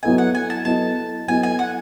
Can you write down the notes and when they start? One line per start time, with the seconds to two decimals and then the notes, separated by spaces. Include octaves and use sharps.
0.03 F#3 B3 E4 A4 D#5 G#5
0.18 F#5
0.35 G#5
0.50 A5
0.65 F#3 B3 E4 A4 D#5 A5
1.28 F#3 B3 E4 A4 D#5 G#5
1.43 G#5
1.59 F#5